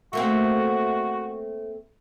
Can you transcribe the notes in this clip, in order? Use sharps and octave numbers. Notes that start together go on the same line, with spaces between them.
A3 A#3 C4 F#4